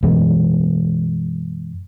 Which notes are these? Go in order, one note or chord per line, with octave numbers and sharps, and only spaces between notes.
F#2 B2 E3 G#3